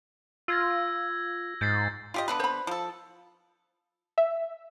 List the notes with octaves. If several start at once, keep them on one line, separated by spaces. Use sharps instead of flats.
F4 E6 G#6 A#6
G#2 G6 A6 C7
F4 G4 D#5
D3 B3 B4
C5 B5
F3 A4
E5